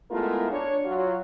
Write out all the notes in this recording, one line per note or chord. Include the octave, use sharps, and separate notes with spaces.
G#3 A3 B3 E4 F4 A#4
D4 C#5
F#3 F4